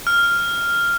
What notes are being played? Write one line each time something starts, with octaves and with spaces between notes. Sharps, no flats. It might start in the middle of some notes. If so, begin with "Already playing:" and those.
F6